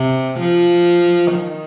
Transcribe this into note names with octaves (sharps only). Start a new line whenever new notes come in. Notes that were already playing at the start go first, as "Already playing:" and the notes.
Already playing: C3
F3
D#3